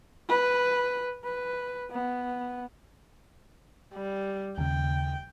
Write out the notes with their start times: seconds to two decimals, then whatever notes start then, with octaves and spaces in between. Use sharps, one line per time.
0.29 B4
1.24 B4
1.91 B3
3.94 G3
4.58 D#2 C#3 G5